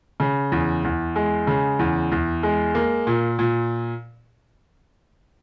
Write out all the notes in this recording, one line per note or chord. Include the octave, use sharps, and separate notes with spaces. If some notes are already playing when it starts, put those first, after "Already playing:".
C#3
E2
E2
G#3
C#3
E2
E2
G#3
A#3
A#2
A#2